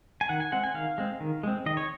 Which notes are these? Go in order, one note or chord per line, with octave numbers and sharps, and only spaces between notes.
G#5
D#3 F#5
G#5
G#3 C4 F#5
G#5
D#3 F5
G#3 C4
D#3
G#3 C4
D#3 D#5
C#5